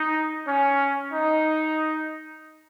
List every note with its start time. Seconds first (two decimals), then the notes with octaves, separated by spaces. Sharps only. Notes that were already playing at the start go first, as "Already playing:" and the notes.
Already playing: D#4
0.47 C#4
1.13 D#4